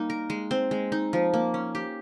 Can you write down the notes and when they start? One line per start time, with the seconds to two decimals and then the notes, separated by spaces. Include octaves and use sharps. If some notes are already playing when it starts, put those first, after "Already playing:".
Already playing: G3 A#3 D#4
0.10 A#4
0.30 G#3
0.51 C4
0.71 G#3
0.92 D#4
1.13 F3
1.34 A#3
1.54 C#4
1.75 G4